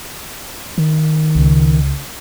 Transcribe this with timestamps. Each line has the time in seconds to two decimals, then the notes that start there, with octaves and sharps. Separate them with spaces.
0.78 D#3
1.35 C#2